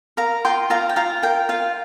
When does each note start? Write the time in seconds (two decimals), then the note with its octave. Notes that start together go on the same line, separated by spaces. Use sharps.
0.17 A#4 F5 A#5
0.45 F4 G5 C6
0.70 F4 F5 A#5
0.89 G5
0.96 F4 F5 A#5
1.23 A#4 G5
1.49 F4 F5